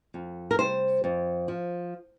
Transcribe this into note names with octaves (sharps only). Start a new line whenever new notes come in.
F2
A#4
C3 G3 C5
F2
F3